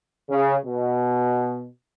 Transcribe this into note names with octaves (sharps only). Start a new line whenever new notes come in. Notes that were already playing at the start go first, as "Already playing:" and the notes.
C#3
B2